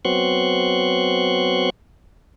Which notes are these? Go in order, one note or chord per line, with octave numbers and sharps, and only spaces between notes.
F#3 B3 C4 C6 C#6 F#6